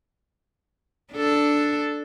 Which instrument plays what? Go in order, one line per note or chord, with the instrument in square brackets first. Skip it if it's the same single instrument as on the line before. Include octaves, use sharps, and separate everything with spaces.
[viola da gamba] D4 A4